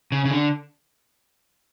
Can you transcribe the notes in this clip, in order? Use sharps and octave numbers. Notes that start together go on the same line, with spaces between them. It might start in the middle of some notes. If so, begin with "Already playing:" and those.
C#3
C#3
D3